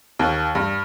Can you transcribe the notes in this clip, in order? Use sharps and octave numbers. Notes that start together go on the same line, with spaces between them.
D#2
G2